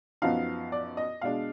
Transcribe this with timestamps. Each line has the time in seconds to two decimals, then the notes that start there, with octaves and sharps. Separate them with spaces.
0.22 F#2 F3 B3 D#4 F5
0.72 D5
0.97 D#5
1.21 B2 G#3 D4 F5